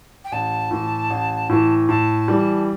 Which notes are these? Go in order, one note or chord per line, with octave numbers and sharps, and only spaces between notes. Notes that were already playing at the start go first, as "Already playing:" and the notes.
G5
A1 A5
A2 E3
A1
A2 E3
A2 A5
E3 G3